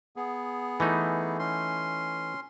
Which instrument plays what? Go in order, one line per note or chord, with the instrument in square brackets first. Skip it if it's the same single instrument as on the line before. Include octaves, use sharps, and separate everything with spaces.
[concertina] B3 G#4
[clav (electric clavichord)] E3 A3 D#4
[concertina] C#4 C6